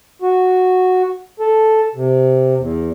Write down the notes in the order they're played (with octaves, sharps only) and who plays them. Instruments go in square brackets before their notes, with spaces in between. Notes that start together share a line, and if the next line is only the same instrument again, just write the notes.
[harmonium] F#4
A4
C3
E2